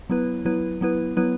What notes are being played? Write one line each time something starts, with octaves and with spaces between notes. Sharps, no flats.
F#3 B3 E4 B4
F#3 B3 E4 B4
F#3 B3 E4 B4
F#3 B3 E4 B4